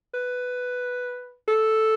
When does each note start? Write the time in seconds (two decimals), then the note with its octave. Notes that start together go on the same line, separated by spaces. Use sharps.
0.14 B4
1.48 A4